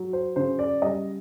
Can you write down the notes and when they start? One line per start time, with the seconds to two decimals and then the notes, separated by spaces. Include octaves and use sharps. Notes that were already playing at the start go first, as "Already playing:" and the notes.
Already playing: F#3
0.13 C5
0.36 C#3 C5
0.59 D5
0.82 G3 D#5